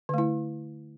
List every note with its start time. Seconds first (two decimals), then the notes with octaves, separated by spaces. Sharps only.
0.09 D3
0.14 A3
0.18 E4